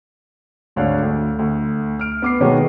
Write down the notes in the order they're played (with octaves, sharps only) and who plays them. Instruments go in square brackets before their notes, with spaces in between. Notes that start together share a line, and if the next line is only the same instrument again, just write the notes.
[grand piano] G#1 D2 D4 C#5 F5 F#6
D2
D2
F6 D7
B3 D6 C7
B2 D#3 F#3 G#3 A3 B3